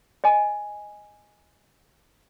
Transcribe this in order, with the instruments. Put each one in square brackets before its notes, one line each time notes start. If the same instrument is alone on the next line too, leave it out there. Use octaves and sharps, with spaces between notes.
[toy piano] D#5 G#5